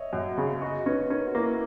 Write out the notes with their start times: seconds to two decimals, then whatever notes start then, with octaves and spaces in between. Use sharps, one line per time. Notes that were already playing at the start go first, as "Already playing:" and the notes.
Already playing: C#5 D#5 E5
0.13 F#2
0.38 C#3
0.61 F#4 D#5
0.86 C#4 B4
1.10 C#4 A#4
1.27 F#4
1.35 A#3 E4